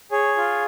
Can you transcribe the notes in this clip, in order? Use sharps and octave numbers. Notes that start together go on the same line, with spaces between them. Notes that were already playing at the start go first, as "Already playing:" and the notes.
G#4 C#5
F4